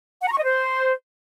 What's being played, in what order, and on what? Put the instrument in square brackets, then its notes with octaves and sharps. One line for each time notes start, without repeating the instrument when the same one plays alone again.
[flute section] F#5
A#5
C#6
D#5
C5